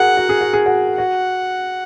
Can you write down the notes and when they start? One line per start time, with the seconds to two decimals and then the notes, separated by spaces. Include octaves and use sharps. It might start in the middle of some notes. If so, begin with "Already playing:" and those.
Already playing: F#4 G#4 A#4 F#5
0.17 F#4
0.29 G#4
0.41 F#4
0.53 G#4
0.66 F#4
0.98 F#4 F#5